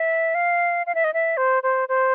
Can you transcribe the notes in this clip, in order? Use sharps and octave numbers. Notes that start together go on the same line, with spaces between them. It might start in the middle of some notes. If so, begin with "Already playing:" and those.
Already playing: E5
F5
F5
E5
D#5
E5
C5
C5
C5